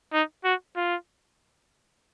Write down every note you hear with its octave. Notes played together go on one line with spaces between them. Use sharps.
D#4
F#4
F4